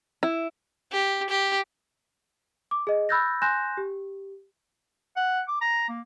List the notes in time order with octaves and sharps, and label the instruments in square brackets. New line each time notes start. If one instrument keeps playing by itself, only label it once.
[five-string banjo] E4
[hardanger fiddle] G4
G4
[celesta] D6
G#4 D#5
B5 E6 F#6 G6 A6 A#6
G#5 C6 F#6 G6 A#6 E7
G4
[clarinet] F#5
D6
A#5
A#3